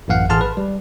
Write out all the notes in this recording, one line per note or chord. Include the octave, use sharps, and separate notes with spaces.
A1 F#2 A#3 F5 F#5
A1 G#4 A5 C6 F6
B4
G3